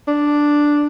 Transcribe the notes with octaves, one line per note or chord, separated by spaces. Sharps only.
D4